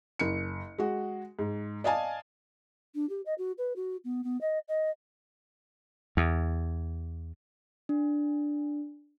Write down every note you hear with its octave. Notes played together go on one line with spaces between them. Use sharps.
F#1 C#7
G#3 F#4
G#2
D5 D#5 F5 G#5 A5
D4
G4
D#5
F#4
B4
F#4
B3
B3
D#5
D#5
E2
D4